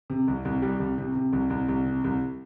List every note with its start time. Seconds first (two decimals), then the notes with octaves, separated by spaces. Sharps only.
0.10 C3
0.28 C2
0.45 C2
0.62 G3
0.80 C2
0.98 C3
1.15 C3
1.33 C2
1.50 C2
1.68 C2
1.86 C3
2.04 C2